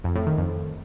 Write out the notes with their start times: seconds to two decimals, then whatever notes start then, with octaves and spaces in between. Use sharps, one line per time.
0.04 F2
0.15 A2
0.27 D#3
0.38 F2